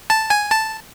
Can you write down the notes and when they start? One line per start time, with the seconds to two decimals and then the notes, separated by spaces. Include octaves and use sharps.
0.10 A5
0.30 G#5
0.51 A5